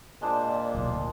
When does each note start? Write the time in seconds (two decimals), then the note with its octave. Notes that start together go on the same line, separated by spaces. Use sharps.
0.22 A#2 G#3 D4 C5
0.74 D1 B1